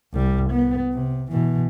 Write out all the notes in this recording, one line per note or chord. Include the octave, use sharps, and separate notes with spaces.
C2 G3
B3
C3
B2 E3